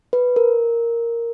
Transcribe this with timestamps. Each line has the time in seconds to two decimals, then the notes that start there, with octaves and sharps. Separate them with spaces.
0.13 B4
0.36 A#4